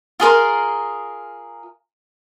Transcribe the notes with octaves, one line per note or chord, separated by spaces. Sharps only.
F4 G#4 A#4 C6